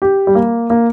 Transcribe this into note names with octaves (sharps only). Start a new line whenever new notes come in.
G4
G3
A#3
A#3